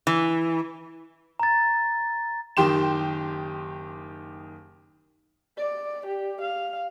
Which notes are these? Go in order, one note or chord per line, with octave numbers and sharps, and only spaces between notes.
E3
A#5 A6
F#1 D#3 G4 G5 C6 E7
D5
G4
F5